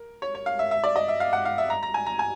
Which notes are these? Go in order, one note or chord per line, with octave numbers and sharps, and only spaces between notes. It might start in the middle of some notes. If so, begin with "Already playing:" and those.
Already playing: A#4
C#5
C#5
F5
E5
E5
D5
D#5
E5
F5
F#5
F5
E5
A#5
A#5
G#5
A#5
G#5